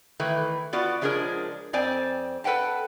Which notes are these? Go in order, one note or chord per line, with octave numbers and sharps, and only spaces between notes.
D#3 E3 A3 B4
B3 F4 F#4 D5
C#3 F3 G#3 D4 G#4 A#4
F2 C4 D5 G#5
A4 B4 F#5 G5 A5